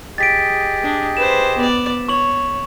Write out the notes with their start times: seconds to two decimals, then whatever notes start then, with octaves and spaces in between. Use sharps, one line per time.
0.18 G4 G#4 D#5 A6 B6 D7
0.83 D4
1.17 B4 C5 E7
1.57 B3 D5
2.08 C#5 C#6 F#7